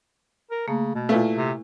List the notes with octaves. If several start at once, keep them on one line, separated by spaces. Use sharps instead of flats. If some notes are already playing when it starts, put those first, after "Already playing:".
A#4
C#3 A3 A#3
B2
A#2 A3 E4 B4 F5
C3